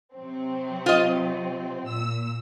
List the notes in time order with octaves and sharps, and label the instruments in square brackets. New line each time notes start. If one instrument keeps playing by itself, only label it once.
[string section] C3 F#3 C4
[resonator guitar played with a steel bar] F4 D#5
[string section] A#2 E6